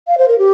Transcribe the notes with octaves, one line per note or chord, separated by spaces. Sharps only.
F5
C5
A#4
G4